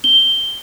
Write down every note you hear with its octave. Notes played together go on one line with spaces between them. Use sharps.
G7